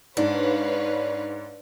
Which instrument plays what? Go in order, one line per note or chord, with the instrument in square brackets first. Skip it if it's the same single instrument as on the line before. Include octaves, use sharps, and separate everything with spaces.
[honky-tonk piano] G#2 [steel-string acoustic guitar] D4 [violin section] B4 C#5 F5